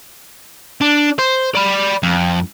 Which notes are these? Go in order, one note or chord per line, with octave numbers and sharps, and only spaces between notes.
D4
C5
D5 B5
F2